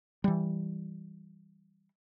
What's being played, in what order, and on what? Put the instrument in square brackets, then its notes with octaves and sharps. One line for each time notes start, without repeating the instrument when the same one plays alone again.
[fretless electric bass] E3 G3